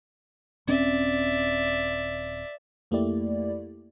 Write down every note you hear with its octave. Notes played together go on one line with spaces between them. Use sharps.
D#1 C4 C#4 D5 E5
F2 A3 A#3 E4 G4 D5